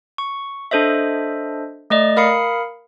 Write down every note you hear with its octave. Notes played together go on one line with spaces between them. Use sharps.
C#6
D4 A4 C5 D#5 E5
A3 D5 D#5
A#4 F5 B5 D#6 C7 C#7